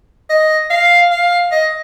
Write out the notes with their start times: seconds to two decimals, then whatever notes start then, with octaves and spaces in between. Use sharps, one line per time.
0.30 D#5
0.70 F5
1.11 F5
1.52 D#5